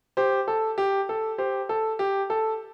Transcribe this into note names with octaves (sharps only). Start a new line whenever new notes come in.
G4 C5
A4
G4
A4
G4 C5
A4
G4
A4